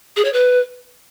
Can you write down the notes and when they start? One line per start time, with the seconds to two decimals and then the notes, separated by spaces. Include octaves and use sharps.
0.16 G#4
0.25 C#5
0.33 B4